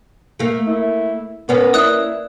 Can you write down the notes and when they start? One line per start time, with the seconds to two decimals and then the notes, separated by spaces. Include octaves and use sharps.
0.39 A3 A#3
0.67 E4
1.49 A#3 B3 C#4 B4
1.73 E4 D5 D#6 F#6